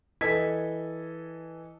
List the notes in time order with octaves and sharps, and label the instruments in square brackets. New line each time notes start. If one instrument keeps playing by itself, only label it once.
[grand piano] E3 A4 D#5 G#6 B6